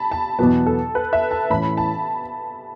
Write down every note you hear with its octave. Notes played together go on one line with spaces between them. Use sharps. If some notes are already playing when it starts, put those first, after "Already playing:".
Already playing: A5 B5
A5
E2 B2 F#3 B3 A5
A4
B4
E5
A5
A2 E3 C#4 E4 B5
A5